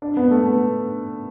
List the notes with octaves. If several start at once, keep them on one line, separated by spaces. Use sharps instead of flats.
D4
B3
A3
B3